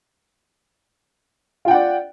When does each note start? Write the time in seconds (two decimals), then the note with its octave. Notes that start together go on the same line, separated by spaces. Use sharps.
1.65 F4
1.68 G5
1.71 F#5
1.73 D5